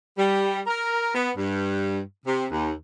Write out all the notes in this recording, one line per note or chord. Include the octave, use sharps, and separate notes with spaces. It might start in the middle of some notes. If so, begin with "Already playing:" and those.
G3
A#4
B3
G2
C3
D#2